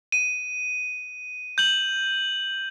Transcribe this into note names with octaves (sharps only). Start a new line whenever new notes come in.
D#7
G6 F#7